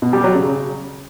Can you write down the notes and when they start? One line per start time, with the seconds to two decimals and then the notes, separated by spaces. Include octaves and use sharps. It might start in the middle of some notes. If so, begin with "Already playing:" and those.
0.02 B2
0.13 G3
0.24 F#3
0.35 C#3